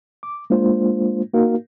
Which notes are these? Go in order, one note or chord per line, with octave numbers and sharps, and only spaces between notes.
D6
G#3 A#3 D4 F4 C5
A#3 D#4 F#4 A#4 F5